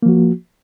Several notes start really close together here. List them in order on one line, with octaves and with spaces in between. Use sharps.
A#3 F3 F#4